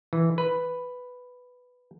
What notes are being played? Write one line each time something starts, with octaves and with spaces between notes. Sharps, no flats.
E3
B4